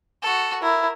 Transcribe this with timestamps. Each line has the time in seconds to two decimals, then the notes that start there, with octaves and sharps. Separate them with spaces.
0.22 F#4 A4
0.63 E4 A#4